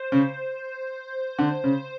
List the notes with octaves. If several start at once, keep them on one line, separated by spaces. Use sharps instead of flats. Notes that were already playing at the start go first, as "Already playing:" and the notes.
Already playing: C5
C#3
D3
C#3